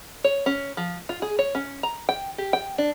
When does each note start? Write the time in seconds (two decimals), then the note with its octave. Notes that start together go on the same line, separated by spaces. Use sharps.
0.24 C#5
0.46 C#4
0.77 F3
1.09 F4
1.22 G#4
1.39 C#5
1.55 C#4
1.83 A#5
2.09 G5
2.38 G4
2.53 G5
2.78 D4